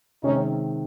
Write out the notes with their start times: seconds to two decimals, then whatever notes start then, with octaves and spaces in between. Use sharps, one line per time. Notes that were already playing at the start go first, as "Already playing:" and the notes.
0.23 C3 D#3 G#3 C4 C#4 D#4